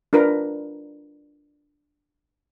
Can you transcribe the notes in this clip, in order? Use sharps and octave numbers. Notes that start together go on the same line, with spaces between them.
D4 F4 A#4 B4